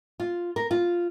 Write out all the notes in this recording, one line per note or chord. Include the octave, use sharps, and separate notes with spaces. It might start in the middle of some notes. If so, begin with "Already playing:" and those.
F4
A#4
F4